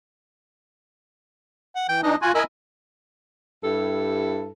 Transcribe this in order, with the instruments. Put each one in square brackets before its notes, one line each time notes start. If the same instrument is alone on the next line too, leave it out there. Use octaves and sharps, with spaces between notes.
[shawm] F#5
[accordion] E3 [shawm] G5
[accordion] E3 D4 D#4 [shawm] D#5
[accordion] F4 G#5 [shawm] F#4
[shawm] E4 [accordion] A#4 D#5 G#5
[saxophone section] G2 E4 G4 A4